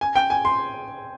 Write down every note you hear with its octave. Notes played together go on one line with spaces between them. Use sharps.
G#5
G5
G#5
C6